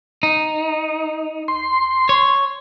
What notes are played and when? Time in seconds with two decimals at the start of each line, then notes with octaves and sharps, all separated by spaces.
0.23 D#4
1.48 C6
2.09 C#5